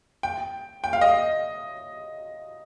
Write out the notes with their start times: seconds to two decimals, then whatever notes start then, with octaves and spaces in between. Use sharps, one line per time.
0.23 G5
0.84 G5
0.93 F5
1.01 D#5